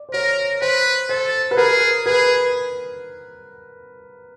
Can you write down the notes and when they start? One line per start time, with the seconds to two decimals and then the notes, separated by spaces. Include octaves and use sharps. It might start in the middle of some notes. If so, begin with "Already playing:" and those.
Already playing: D5
0.09 C5
0.13 A#4 C#5
0.62 B4 C5
1.09 A4 C5
1.51 B4
1.57 G#4 A#4
2.06 G#4 B4